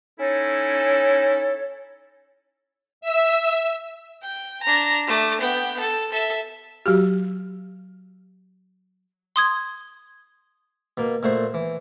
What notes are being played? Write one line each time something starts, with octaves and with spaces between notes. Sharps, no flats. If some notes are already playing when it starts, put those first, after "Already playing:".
C#4 D#4 E4 A4 C#5
E5 E6
G5
D4 A#5
A3 D6
B3 G5
A4
A4 E5
F#3 F#4 G4
C6 D#6 G#6
B2 A#3
A#2 A3 F#4 C5
E3